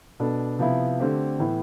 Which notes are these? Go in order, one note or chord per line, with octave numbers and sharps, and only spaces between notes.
B2 B3 D4 A4
C3 F3 B3 E4
D3 A3 C4 G4
A2 E3 B3 E4